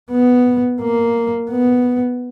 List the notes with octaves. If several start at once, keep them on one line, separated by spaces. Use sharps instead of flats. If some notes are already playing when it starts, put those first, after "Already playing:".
B3
A#3
B3